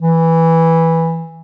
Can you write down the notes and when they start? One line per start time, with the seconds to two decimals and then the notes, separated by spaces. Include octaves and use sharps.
0.01 E3